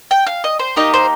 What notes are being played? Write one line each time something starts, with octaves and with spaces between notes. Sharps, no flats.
G5
F5
D#5
C5
A#3 D#4 G4 D#5
C5